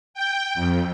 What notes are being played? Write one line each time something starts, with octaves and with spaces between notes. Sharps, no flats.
G5
F2